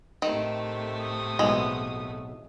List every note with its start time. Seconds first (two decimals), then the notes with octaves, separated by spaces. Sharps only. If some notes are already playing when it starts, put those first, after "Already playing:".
0.22 A2 C3 D#3 A3
1.01 D#6
1.39 B1 B2 E3 G#3